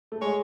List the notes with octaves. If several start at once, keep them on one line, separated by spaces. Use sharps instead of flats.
A3
G#3 C#5